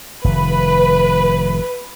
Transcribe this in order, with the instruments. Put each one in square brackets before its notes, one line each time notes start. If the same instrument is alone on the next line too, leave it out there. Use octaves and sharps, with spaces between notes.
[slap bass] F1 D#3 [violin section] B4